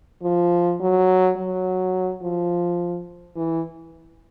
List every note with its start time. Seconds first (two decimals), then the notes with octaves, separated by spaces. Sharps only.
0.23 F3
0.80 F#3
1.37 F#3
2.22 F3
3.36 E3